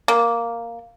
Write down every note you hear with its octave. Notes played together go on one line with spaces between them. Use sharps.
A#3